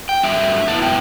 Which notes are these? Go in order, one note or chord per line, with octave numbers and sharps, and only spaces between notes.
G5
G2 F#3 A3 D4 E5
F#2 F#3 B3 E4 A5
G5